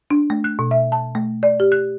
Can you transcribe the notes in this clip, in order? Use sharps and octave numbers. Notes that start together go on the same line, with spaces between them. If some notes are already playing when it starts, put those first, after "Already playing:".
D4
A3
F#6
B2
E5
A5
A3
D5
G4
F#6